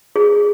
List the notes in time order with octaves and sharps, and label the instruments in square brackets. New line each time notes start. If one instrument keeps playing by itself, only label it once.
[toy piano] G#4